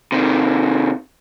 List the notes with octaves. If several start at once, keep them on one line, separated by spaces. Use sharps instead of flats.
C3 D#3